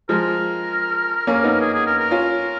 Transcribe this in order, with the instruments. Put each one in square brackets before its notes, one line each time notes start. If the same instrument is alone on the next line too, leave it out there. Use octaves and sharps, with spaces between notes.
[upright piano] F3 G#3 [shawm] A#4
[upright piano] A#3 C#4
B3 D#4
[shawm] G#4
G#4
A#4
A#4
[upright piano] C#4 F4